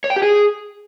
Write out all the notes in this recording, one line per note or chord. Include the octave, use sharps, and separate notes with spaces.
C#5
G5
G4
G#4